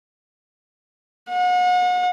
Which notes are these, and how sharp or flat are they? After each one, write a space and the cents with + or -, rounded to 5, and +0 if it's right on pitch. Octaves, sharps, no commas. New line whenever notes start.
F#5 -40